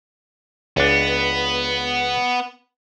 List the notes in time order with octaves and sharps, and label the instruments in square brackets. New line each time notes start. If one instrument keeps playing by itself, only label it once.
[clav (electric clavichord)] C#2 D4 [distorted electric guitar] B3